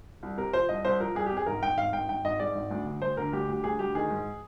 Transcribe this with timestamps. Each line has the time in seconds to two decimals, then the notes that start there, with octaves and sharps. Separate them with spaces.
0.23 C2
0.37 C3 A#4
0.53 F3 C5
0.69 C2 D#5
0.85 C2 C5
1.00 F3 A#4
1.15 C2 G#4
1.26 G4
1.32 C3
1.37 G#4
1.46 G#1 A#4
1.62 G#1 G5
1.77 G#1 F5
1.93 G#1 G5
2.08 G#1 G5
2.25 G#1 D#5
2.39 G#2 D5
2.55 G#1
2.71 D2
2.86 D3
3.01 D2 C5
3.17 D3 A#4
3.33 D2 G4
3.48 D2 G4
3.64 D2 G#4
3.79 D2 G4
3.95 D#3 G#4
4.10 G#2